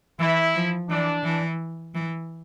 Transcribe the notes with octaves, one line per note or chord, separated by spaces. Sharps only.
E3 E4
F3
E3 D4
E3
E3